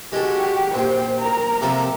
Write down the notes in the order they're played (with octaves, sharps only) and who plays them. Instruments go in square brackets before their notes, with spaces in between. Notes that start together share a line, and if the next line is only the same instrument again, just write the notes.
[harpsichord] G#3 A4 [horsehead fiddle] F#4 G4
[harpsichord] A#1 G5 [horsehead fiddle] C5
[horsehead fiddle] A#4 A#5
[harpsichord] C3 F3 A4